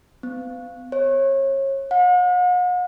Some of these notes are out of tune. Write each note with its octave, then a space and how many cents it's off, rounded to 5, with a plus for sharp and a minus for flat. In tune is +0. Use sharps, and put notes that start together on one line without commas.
B3 +45
C#5 -30
F#5 -45